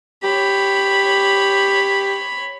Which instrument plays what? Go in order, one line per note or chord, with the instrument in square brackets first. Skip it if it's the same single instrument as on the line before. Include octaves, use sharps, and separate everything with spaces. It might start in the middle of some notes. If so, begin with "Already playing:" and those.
[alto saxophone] G4 [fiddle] C#5 B5